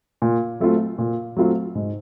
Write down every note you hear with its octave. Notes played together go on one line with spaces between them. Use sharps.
A#2
F#3 A3 C4 F4
A#2
F#3 A3 C4 F4
G#2